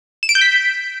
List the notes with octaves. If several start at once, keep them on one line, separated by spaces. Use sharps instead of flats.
E7
D7
G6
B6